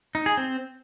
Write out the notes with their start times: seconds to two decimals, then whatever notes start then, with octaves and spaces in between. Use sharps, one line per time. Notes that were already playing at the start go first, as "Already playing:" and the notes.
0.15 D#4
0.26 G#4
0.37 C4